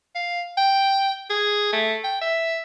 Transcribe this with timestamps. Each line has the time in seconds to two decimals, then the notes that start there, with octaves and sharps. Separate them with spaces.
0.15 F5
0.57 G5
1.30 G#4
1.73 A3
2.04 G5
2.21 E5